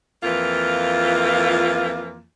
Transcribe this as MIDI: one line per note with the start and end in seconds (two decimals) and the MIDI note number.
0.24 2.22 41
0.24 2.22 52
0.24 2.22 58
0.24 2.22 65